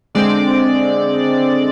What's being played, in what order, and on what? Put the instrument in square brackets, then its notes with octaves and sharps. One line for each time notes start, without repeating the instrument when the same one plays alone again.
[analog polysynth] D3 G#3 C4 D5